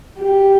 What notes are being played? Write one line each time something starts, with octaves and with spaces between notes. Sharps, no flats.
G4